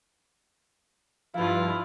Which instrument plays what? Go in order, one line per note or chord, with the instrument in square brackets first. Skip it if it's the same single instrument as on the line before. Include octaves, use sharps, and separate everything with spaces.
[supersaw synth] G2 F3 [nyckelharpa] E4 F4 [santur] B4 F5